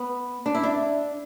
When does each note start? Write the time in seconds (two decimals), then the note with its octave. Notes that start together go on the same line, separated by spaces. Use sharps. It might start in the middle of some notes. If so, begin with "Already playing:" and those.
Already playing: B3
0.46 D4
0.55 E4
0.63 D4